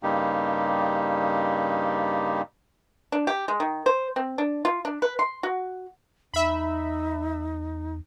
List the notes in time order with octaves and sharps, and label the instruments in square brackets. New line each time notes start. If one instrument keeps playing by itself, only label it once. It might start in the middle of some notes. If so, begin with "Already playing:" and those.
[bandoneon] G2 C#3 G3 A#3 D#4 G4
[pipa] D4
G4
G#3
D#3
C5
C4
D4
F4
D4
B4
C6
F#4
[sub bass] E2 [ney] D#4 [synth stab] E5 B5